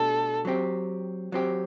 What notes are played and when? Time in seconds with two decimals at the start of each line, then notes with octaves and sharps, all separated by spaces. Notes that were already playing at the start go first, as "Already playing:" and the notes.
Already playing: B2 A3 D4 G4 A4
0.45 F#3 C4 G4
1.32 F#3 C4 G4